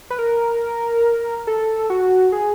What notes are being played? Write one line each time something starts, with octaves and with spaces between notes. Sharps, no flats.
B4
A#4
A4
F#4
G#4